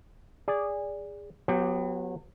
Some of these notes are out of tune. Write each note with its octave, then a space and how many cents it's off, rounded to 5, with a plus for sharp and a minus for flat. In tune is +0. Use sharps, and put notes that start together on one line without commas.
G#4 -20 D5 -10
F#3 -30 B3 +0 G4 +0